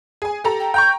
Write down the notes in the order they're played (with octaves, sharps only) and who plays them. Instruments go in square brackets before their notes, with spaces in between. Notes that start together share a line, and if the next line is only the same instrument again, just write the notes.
[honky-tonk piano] G#4 G#5
G4 A4 A#5
[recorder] G5
[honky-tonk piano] G5 A#5 C#6 [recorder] G6